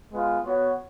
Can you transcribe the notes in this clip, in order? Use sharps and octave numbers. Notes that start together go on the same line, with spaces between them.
G#3 B3 F4
B3 F#4 C#5